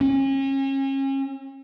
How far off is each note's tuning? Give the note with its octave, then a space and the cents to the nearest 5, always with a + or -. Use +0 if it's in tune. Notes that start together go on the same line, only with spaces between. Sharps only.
C#4 -35